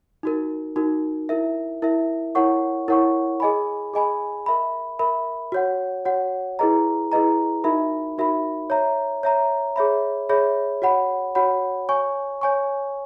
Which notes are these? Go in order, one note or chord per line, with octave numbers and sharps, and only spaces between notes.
D#4 F#4 A#4
D#4 F#4 A#4
E4 A#4 E5
E4 A#4 E5
E4 A#4 C#5 F#5 C#6
E4 A#4 C#5 F#5 C#6
G#4 D#5 G#5 B5
G#4 D#5 G#5 B5
A#4 E5 B5
A#4 E5 B5
F#4 C#5 F#5
F#4 C#5 F#5
E4 G#4 B4 D#5 A#5
E4 G#4 B4 D#5 A#5
D#4 F#4 A#4 E5 B5
D#4 F#4 A#4 E5 B5
C#5 E5 A#5
C#5 E5 A#5
G#4 C#5 E5 B5
G#4 C#5 E5 B5
F#4 C#5 F#5 B5
F#4 C#5 F#5 B5
C#5 G#5 C#6
C#5 G#5 C#6